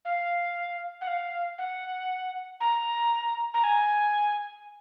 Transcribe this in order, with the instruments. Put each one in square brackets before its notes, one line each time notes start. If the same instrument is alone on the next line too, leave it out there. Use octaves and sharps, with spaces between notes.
[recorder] F5
F#5
F5
F#5
A#5
A#5
G#5